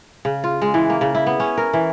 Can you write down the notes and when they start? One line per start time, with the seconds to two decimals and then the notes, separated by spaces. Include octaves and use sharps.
0.25 C#3
0.44 F4
0.62 G#3
0.74 E3
0.90 A#3
1.01 C#3
1.15 E4
1.27 B3
1.40 C#4
1.58 A#4
1.74 E3